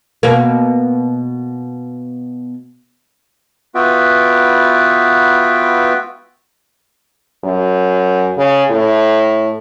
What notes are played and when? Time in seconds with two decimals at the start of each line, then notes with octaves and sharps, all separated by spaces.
0.23 B2 A#3
3.75 B3 F4 F#4 B4 E5 G5
7.44 F#2
8.37 C#3
8.70 A2